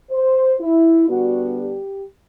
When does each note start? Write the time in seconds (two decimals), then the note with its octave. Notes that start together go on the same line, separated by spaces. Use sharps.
0.10 C5
0.60 E4
1.08 D3 G3 B3 D4 F#4
1.58 G4